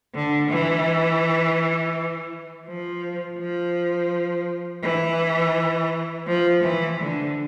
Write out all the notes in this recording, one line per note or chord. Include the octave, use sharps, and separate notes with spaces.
D3
E3
F3
F3
E3
F3
E3
D3